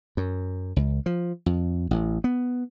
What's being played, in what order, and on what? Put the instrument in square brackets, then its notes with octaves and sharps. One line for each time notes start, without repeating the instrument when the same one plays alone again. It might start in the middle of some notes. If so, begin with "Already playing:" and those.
[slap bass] F#2
C#2
F3
F2
A1
B3